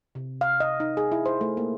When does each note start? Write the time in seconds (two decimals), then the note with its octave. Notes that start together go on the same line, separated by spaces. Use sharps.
0.15 C3
0.41 F5
0.60 D#5
0.80 D#4
0.97 G#4
1.12 E4
1.26 C5
1.41 A3
1.57 A#3